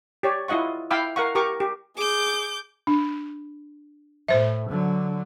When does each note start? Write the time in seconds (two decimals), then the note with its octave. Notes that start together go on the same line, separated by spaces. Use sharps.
0.23 G4 C#5 D5
0.48 E4 F4 D#5 F#5 C#6
0.91 E4 F5 G5 B5 D6 E6
1.16 A#4 F5 F#5 C#6
1.35 G4 A#4 C#6 D6
1.60 G4
1.97 G#4 D6 G6
2.87 D4
4.29 A2 C5 E5
4.70 D3 F#3